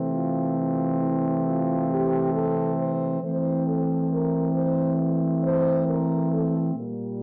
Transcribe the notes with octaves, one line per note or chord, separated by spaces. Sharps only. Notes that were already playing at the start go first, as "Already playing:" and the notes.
Already playing: C3 E3 A3 C4
F4
F4
E4
F4
G4
A4
C5
E3 A3 C4 C5
A4
A#4
C5
C5
A#4
A4
A#2 G3 A#3